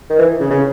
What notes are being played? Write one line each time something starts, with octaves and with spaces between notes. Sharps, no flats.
D#3
E3
C#3
C#3